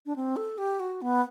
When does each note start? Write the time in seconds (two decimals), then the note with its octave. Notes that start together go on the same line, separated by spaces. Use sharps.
0.06 D4
0.16 C4
0.36 A4
0.58 G4
0.80 F#4
1.02 B3